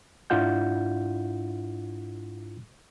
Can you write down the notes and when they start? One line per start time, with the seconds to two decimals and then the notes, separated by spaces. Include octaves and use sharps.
0.30 G#2 D4 E4 F4 F#5 G6